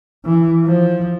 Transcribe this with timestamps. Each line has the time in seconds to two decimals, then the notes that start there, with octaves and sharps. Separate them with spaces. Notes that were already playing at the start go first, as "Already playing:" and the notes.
0.25 E3
0.64 F3